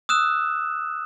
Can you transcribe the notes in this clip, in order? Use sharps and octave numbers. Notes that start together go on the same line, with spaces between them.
D#6 E6 F#6 E7